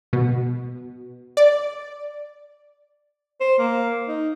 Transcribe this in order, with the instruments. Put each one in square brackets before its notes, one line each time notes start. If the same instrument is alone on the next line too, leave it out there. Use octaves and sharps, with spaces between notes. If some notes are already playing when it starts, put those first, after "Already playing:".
[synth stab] B2
D5
[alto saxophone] C5
A#3
D#4